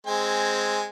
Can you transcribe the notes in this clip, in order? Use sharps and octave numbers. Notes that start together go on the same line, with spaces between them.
G#3 C4 G#5